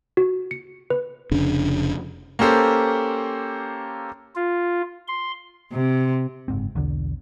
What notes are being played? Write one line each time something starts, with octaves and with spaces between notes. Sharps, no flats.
F#4
C#7
B4
F1 C#3 D4
A#3 C#4 G4 A4 C5
F4
C6
C3
F#1 G#2 C4
B1 E2 D3